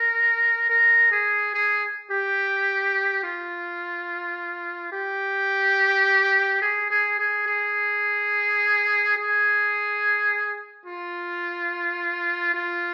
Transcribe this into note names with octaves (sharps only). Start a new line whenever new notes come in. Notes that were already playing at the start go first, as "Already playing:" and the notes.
Already playing: A#4
A#4
G#4
G#4
G4
F4
G4
G#4
G#4
G#4
G#4
G#4
F4
F4